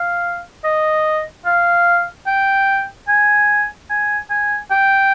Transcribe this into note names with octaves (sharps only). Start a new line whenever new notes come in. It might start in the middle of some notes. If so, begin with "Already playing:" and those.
Already playing: F5
D#5
F5
G5
G#5
G#5
G#5
G5